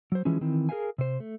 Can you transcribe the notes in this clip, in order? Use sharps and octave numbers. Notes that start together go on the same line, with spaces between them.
F#3 C5
E3 F3 G#3 C#4
D#3 E3 C4
G#4 A#4 C5 E5 F5 G#5
C3 C5
A3